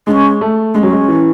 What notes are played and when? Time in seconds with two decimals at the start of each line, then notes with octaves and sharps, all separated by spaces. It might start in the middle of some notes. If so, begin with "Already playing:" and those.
0.07 G#3 D4
0.11 C#4
0.41 A3
0.74 G#3 D4
0.79 F#3 C#4
0.92 G#3
1.08 E3